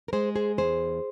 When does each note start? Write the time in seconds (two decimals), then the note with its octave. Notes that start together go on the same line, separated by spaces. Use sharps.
0.08 A#4
0.13 G#3 G#4 C5
0.36 G#4 C5
0.58 E2 G#4 C5